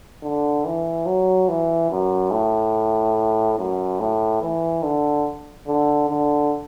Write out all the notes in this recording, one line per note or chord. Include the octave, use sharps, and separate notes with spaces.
D3
E3
F#3
E3
F#2
A2
F#2
A2
E3
D3
D3
D3